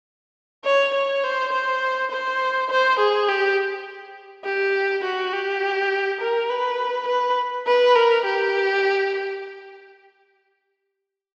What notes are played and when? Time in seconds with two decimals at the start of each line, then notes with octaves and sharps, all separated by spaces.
0.65 C#5
0.94 C#5
1.24 C5
1.52 C5
2.11 C5
2.70 C5
2.99 G#4
3.28 G4
4.45 G4
5.04 F#4
5.33 G4
6.21 A#4
6.50 B4
7.07 B4
7.67 B4
7.96 A#4
8.25 G4